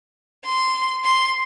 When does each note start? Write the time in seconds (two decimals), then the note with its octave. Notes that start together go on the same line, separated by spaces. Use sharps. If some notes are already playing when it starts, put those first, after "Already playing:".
0.45 C6
1.04 C6